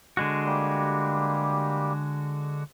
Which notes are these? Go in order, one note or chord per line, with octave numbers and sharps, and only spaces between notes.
D3 G#3 F#4
G3 A#3 G4